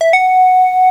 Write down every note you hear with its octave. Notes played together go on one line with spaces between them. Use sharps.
E5
F#5